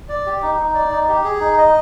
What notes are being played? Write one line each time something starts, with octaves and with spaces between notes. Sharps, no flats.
D5
G4
D#4
D#4
D5
D#4
G4
G#4
D#4
D#5